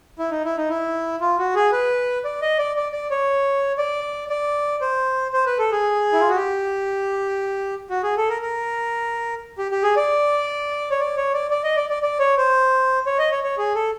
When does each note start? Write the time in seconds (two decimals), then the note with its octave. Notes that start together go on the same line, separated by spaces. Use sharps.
0.19 E4
0.31 D#4
0.44 E4
0.57 D#4
0.69 E4
1.21 F4
1.39 F#4
1.55 G#4
1.72 B4
2.25 D5
2.42 D#5
2.58 D5
2.76 D5
2.92 D5
3.11 C#5
3.78 D5
4.30 D5
4.81 C5
5.33 C5
5.46 B4
5.59 A4
5.72 G#4
6.13 E4
6.20 F4
6.29 F#4
6.36 G4
7.90 F#4
8.03 G#4
8.17 A4
8.30 A#4
8.42 A#4
9.58 G4
9.71 G4
9.83 G#4
9.96 D5
10.91 C#5
11.00 D5
11.17 C#5
11.34 D5
11.51 D5
11.64 D#5
11.76 D5
11.90 D5
12.03 D5
12.19 C#5
12.37 C5
13.06 C#5
13.18 D#5
13.31 C#5
13.44 C#5
13.58 G#4
13.75 A4